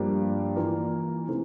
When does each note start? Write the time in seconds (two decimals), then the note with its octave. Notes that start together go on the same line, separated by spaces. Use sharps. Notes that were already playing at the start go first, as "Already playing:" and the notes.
Already playing: G2 F3 A#3 D4 G4
0.56 E3 A#3 F4 A#4
1.28 C3 E3 A3